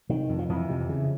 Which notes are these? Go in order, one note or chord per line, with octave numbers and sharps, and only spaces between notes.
C3 D#3
F2
F3
F2 E3
C3
C#3